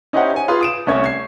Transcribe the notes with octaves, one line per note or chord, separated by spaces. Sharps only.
C#4 D#4 E4 G4 C5 F#5
C#5 G#5
F4 G#4 B4 F5 G#5 C6
D#6 D7 E7
C2 A3 C#4 C#5 G#6
G#6 C7